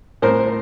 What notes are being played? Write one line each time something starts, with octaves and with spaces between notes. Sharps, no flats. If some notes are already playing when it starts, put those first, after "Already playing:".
A2 A#4 C5